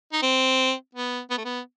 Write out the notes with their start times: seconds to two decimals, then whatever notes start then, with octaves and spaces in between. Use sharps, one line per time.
0.13 D#4
0.22 C4
0.95 B3
1.30 B3
1.38 A3
1.45 B3